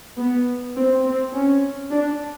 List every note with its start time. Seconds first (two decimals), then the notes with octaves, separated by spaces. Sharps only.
0.18 B3
0.76 C4
1.05 C4
1.33 C#4
1.91 D4